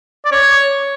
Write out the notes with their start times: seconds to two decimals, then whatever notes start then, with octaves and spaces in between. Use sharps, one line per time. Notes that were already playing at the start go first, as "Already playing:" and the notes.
0.25 D5
0.32 C#5